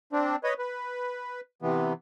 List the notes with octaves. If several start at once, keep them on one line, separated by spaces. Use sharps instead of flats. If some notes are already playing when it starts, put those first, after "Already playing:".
C4 D4
B4 C#5 D#5
B4
C3 E3 B3